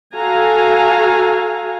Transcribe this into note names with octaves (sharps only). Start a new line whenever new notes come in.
F#4 A4 F5 G#5 A#5